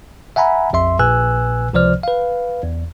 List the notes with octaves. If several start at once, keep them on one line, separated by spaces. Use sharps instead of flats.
E5 F#5 G#5 A#5 B5
A#1 F2 E5 C6
A#1 A#2 B4 G#5 E6 F#6
C#2 C3 F3 C5 D5 F6
B4 F5
E2